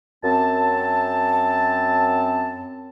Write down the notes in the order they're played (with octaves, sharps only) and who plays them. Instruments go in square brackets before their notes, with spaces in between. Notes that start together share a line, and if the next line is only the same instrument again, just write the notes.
[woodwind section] F#2 C4 A5